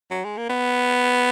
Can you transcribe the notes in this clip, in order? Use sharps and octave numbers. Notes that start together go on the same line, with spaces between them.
F#3
G#3
A#3
B3